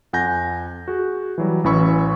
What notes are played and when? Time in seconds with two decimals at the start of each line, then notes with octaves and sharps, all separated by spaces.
0.13 F2 F#5 G#5 G6 A#6
0.88 F#4 G#4
1.38 E3 F#3 G3
1.64 A1 E3 C#4 B5 C#6 E6